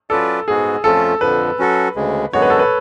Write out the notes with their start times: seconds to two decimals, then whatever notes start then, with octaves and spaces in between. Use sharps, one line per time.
0.10 F#3 C#4 F4 A4 B4 D5
0.47 G#2 G#3 B3 F#4 G#4
0.84 F2 F3 A3 C#4 F4 A4
1.21 F2 D3 F3 B4
1.59 F#3 C#4 F#4 A4
1.96 D2 C#3 G#3
2.33 F#2 D3 G#3 B3 F#4 C#5
2.42 B4
2.50 A4
2.59 B4